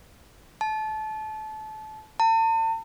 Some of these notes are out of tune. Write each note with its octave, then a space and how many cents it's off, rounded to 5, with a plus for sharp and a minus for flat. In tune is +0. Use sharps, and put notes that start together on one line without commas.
A5 -25
A5 +40